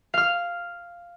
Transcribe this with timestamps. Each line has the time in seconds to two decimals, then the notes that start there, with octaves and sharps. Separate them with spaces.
0.14 F5 F6